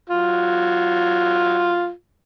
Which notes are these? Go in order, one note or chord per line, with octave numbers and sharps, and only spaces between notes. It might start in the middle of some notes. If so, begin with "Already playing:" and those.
F#3 F4